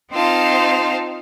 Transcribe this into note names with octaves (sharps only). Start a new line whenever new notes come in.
C4 D#4 F4 C5 F5 A5